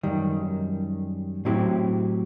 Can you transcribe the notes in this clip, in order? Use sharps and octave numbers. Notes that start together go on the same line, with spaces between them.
F#2 D#3 G3
A2 F#3 C4 E4 G4